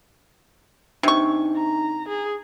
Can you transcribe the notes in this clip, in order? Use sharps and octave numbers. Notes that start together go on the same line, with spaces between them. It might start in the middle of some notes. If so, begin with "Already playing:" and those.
C3 D4 D#4 C#6
A#5
G#4